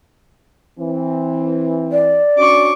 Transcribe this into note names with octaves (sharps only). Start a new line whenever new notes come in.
E3 C4
D5
C#4 D4 F#4 C#6 D6